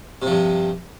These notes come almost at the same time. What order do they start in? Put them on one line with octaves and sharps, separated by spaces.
C3 F3 G2